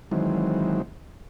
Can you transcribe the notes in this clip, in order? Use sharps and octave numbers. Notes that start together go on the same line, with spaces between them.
D#3 E3 F#3 G#3 C4